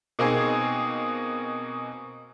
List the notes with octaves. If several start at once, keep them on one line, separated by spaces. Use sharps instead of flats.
B2 A#3 C4 D#4 G#4